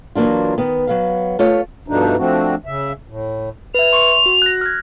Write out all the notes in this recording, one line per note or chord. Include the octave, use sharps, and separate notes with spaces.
E3 F#3 A#3 D4 F4
D#3 B3
F#3 B3 F5
A3 F4 C#5
G2 B2 F3 A3 D4 D#4
F3 A3 C4 D4 F#4
C#3 E5
A2
B4 E5 F7
C6 C#6
F#4
F#6 A#6
F6 F#6 G#6